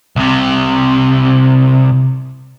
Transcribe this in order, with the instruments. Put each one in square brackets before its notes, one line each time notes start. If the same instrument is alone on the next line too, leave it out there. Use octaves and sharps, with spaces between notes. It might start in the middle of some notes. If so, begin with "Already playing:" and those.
[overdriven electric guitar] C2 C3